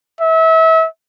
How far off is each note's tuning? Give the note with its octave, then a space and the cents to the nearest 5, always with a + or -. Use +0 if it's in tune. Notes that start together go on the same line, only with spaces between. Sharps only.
E5 -30